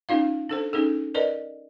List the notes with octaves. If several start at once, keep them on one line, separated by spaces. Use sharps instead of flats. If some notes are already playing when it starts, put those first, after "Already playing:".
C#4 D#4 F4 F5
D4 A4 C5
C#4 D#4 G#4 A4
A#4 B4 D5 D#5